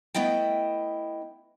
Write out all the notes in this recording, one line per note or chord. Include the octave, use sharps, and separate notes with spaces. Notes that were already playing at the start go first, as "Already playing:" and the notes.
A3 B3 E4 D#5 G5